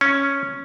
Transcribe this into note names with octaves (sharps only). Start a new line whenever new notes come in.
C#4